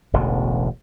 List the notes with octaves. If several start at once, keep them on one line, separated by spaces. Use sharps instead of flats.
E1 A1 B2 D3